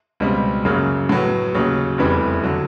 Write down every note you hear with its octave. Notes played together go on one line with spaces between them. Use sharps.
C#2 B2 G3 C4
F#2 C#3 F#3 A#3
A2 F#3 B3
D#2 C#3 F#3
F1 E2 C3 E3 G3
D3 F#3